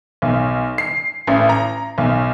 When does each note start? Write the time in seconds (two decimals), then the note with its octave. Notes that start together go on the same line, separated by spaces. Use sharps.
0.22 B1
0.78 C7
1.27 A1
1.49 A#5
1.98 B1